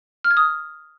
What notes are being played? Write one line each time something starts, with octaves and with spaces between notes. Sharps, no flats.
F6
G#6
D#6